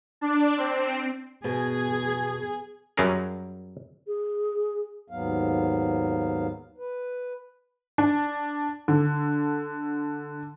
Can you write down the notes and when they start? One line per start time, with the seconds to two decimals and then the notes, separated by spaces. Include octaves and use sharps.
0.21 D4
0.57 C4
1.44 B2 G#4
2.97 F#2 F#3 G3 C#4 G#4 A#4
4.07 G#4
5.10 D#2 G#2 F#3 B3 F5
6.78 B4
7.98 D4
8.88 D3